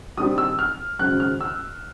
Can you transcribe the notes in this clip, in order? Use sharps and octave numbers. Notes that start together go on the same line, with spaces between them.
G2 D#3 G3 C4 D#6
E6
F6
G#1 F#2 C#3 F#6
F6
E6